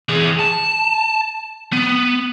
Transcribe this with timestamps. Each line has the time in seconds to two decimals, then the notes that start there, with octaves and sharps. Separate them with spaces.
0.09 E3 G#4
0.39 A5
1.73 B3